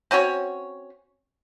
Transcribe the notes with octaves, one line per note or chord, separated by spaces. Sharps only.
C4 C#4 F#4 C#5